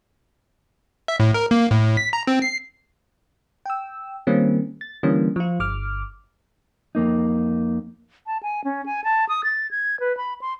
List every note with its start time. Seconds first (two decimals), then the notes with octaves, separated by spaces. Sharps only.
1.08 E5
1.20 A2
1.34 A#4
1.51 A#3
1.71 A2
1.97 B6
2.13 A#5
2.27 C4
2.42 C7
3.66 G5 E6
4.27 D#3 G3 A#3 C4 C#4
4.81 A6
5.03 D3 E3 G3 A#3 C#4
5.36 F3 F4
5.60 G1 D6 F6
6.95 F2 A#3 D#4
8.27 A5
8.43 G#5
8.64 C#4
8.86 G#5
9.04 A5
9.29 D#6
9.44 A6
9.71 G#6
10.00 B4
10.17 B5
10.41 C6